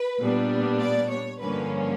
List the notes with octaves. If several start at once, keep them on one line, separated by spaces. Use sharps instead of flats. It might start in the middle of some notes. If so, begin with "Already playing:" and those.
Already playing: B4
A#2 G3 B3 D4
D5
C#5
G2 D3 F3 A#3 C#4 B4